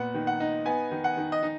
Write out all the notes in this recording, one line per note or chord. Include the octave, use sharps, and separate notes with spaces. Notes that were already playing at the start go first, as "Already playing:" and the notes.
Already playing: A#2 B3 F#5
D#3
F#5
D#4
B3 G#5
D#3
F#5
D#3
D#5
D#4